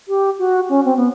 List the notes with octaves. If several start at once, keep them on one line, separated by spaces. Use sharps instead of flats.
G4
F#4
C#4
C4
B3